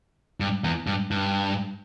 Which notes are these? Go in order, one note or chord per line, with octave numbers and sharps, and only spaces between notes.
G2
E2
G2
G2